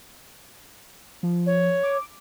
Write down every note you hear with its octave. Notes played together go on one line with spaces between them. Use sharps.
F3
C#5
D6